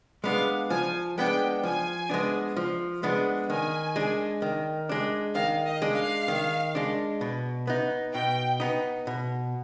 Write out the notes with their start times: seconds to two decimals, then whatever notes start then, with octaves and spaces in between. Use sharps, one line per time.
0.24 G#3 B3 D4 F5
0.70 F3 G#5
1.17 G#3 B3 D4 G5
1.64 F3 G#5
2.10 G#3 B3 D4
2.57 F3
3.03 G#3 B3 D4
3.49 D#3 G#5
3.96 G#3 D4
4.42 D#3
4.89 G#3 D4
5.35 D#3 F5
5.67 D#5
5.82 G#3 D4
5.97 F5
6.28 D#3
6.75 G#3 D4
7.21 B2
7.67 B3 D#4
8.14 B2 G5
8.60 B3 D#4
9.07 B2